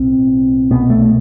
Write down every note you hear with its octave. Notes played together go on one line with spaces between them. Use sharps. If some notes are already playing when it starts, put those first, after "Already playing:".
Already playing: B1 A2 C4
C2 B2 B3
A3